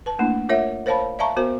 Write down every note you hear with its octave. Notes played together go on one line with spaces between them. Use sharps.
B4 A5
A3 A#3 D4 E4
F4 A#4 C#5 E5 F#5
A#4 C5 C#5 F5 A5 B5
D5 E5 F5 A5 A#5 C#6
B3 F#4 A#4 C5